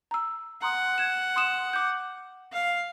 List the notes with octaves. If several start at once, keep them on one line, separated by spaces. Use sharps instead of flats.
A#5 E6
F#5 A#5 C6 D#6
G#6 E7
C6 D#6 E7
D6 G6
F5